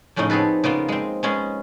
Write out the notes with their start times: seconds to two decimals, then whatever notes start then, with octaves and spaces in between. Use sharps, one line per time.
0.16 F2 A2 C#3 C#4 D#4
0.30 B3 C4 G#4 A4 B4
0.64 C#3 A#3 B3 F4
0.88 G#3 C4
1.23 G#3 B3 C#4 G#4 D#5